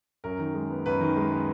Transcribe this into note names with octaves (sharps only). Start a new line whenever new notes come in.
F#2 A#4
D#3
G#3
B3
F#2 B4
D#3
G#3
B3